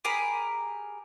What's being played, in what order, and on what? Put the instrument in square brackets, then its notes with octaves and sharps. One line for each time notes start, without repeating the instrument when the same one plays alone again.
[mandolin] G4 G#4 A#4 B5